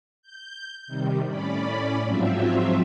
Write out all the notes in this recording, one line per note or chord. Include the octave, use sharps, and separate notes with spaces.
G6
C3 D#3 G3
A2 C#4 D5 B5
G#2 F3 F#3 C4 F4 E5